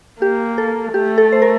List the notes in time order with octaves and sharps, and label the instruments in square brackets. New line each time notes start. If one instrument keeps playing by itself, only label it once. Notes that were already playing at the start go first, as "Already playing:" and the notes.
[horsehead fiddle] A#3 [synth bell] G4
[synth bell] A4
[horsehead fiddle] A3 [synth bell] G4
[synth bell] A4
C5
A#4